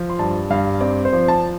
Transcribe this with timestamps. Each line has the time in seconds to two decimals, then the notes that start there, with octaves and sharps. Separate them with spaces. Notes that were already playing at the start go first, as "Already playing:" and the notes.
Already playing: F3
0.09 C6
0.19 G2 A5
0.50 G2 F5
0.81 C4 D5
1.05 C5
1.13 F3
1.28 A5